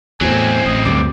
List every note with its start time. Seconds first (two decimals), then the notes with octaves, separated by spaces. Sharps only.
0.21 E2 A2 F#3 C4 G#5
0.66 A1 D#5
0.85 D2 G2 D5